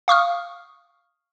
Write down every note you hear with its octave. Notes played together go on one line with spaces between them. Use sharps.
F5 C#6 D#6 F6